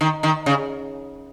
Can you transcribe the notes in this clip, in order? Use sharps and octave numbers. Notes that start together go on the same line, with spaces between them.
D#3
D#3
C#3